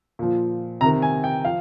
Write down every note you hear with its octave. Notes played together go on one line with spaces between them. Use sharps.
A#2 F3
C3 D#3 A#5
G#5
G5
F3 F5